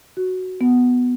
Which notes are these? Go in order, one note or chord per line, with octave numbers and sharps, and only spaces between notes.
F#4
B3